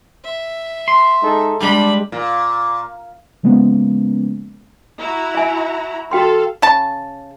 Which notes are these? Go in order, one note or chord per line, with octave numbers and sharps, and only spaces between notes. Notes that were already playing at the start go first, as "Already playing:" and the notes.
E5
C6
G#3 D#4 A4
G3 G#3 D4 B5
A#2
C#3 F3 G#3 A#3 B3 C#4
E4 F#4 A#5
E5 G#5
F#4 A4 F5 G5 C6
C#3 A5